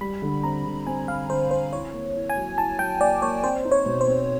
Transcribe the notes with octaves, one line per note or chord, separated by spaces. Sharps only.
G3 B5
D3
C4 A#5
D3
C4 G#5
D3 F5
D3 C5
C4 C5
E4 C#5
A#3
E4
G#5
F#3
E4 A5
F#3 G5
A#3 D5
A#3 C#5
C4 C5
D#4
C#5
B2
C5
C4